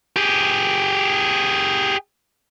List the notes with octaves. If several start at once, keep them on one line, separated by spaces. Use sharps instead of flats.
G4 G#4